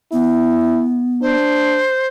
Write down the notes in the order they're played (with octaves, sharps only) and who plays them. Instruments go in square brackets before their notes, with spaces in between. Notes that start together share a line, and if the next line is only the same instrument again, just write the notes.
[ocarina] B3 [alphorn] E4
[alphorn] D4 [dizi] C5